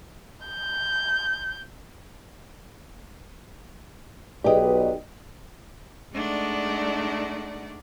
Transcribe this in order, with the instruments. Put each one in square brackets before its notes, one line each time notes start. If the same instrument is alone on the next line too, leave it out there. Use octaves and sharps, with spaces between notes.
[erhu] G6
[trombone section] B1 [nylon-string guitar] G4 G#4 G5 [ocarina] B4 [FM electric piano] D5 D#5
[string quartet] G#3 A3 D4 D#4 D5 F#5